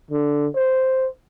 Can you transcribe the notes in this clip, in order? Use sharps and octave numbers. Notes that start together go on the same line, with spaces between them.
D3
C5